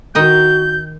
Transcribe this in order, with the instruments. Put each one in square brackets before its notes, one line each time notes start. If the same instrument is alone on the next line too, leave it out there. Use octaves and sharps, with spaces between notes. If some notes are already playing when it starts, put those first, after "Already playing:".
[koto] D#3 D#5 G5 [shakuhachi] F#4 [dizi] G6